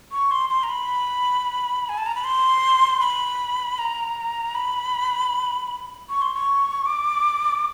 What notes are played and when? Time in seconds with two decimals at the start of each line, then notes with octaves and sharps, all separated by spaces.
0.12 C#6
0.31 C6
0.50 C6
0.63 A#5
0.69 B5
1.89 G#5
1.98 A5
2.06 A#5
2.15 B5
2.24 C6
3.00 B5
3.78 A#5
4.55 B5
6.09 C#6
6.22 C6
6.34 C#6
6.86 D6